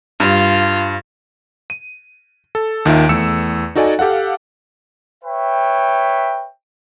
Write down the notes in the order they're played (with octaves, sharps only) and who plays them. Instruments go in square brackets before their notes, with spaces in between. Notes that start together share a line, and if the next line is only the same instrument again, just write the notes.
[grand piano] G2 [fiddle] F4
[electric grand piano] D#7
A4
D#2 D#3 F4 E5 D7
E2 A3 E6 C#7 E7
D#4 F#4 A4 D5 D#5 G#5
G4 A4 F5 F#5
[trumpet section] B4 C#5 E5 G5